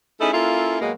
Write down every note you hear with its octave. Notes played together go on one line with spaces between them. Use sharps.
A3 C#4 D#4 E4 G#4 A4
A#3 C#4 E4 F4 A4
B2 F#3 G#3 A#3